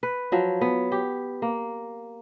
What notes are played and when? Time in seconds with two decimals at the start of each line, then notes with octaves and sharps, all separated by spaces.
0.03 B4
0.32 F3 F#3
0.61 B3
0.92 G4
1.42 A#3